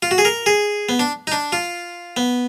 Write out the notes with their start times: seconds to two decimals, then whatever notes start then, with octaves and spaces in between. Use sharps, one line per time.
0.02 F4
0.11 F#4
0.18 G#4
0.25 A#4
0.46 G#4
0.89 B3
0.99 D4
1.27 D#4
1.32 D4
1.52 F4
2.17 B3